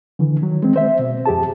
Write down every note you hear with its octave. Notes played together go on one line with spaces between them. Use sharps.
D3 E3
D#3 F#3
G#3 C4
C5 E5
B2
F2 G4 G#4 A5